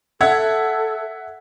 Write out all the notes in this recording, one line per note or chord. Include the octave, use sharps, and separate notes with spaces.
A4 E5 F#5 G#6